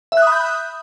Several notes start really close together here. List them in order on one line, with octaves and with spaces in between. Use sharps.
E5 F#6 D#6 B5 G6